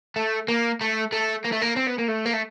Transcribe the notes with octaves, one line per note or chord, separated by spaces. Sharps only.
A3
A#3
A3
A3
A#3
A3
A#3
C4
B3
A#3
A3
A#3
A3